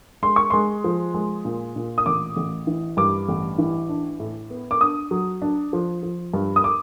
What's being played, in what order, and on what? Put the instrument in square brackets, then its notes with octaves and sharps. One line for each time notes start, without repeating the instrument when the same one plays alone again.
[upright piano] G#3 C6
C#6
G#3 C6
F3
G#3
A#2
A#2
D#6
A1 D6
A1
E3
G2 D6
A1
E3
D4
A2
B3
D6
D4 D#6
F#3
D4
F3
F3
G2
D#6
D6